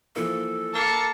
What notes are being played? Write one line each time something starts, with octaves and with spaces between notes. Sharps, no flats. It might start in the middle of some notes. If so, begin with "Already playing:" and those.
E3 F3 A#3 A4
A#3 A5 C#7